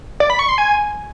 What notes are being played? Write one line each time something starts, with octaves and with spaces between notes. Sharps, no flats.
D5
B5
C#6
C6
G#5